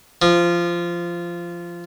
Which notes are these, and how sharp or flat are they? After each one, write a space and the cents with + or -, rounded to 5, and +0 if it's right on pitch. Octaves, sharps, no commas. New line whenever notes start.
F3 -15